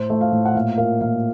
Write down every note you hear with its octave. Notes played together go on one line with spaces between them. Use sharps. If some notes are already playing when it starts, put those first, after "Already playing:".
Already playing: A2 C5
A3
F5
A2
F#5
A#2 F5
A#3 F5
A#2 F5